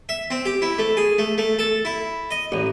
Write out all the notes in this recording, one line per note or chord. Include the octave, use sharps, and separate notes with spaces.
E5
C4
G4
E4
A3
G#4
A3
A3
A4
E4
D#5
A1